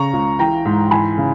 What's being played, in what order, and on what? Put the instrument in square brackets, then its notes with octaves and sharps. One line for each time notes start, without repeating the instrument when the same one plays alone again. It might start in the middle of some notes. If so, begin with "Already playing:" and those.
Already playing: [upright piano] C#3 A#5 C#6
C#2
E3 G5 A#5
G#2
E3 G#5 B5
C#3